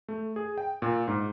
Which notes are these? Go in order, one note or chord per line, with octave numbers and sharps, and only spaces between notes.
A3
G#4
G5
A#2
G#2